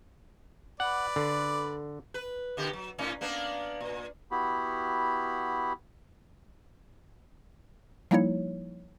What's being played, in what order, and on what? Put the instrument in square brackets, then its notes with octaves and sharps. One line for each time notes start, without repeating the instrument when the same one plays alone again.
[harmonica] B4 D5 [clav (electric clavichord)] F#5
[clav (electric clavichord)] D3
[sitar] B4
B2 D3 G4
F#3
A2 C#4 D#4
A#3 B3 D4
A#2
[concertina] B3 E4 F#4 G4 B5
[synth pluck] F3 G3 A#3 D#4 E4 C#5